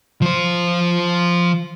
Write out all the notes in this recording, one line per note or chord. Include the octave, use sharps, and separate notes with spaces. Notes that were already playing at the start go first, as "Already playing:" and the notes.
F3 C5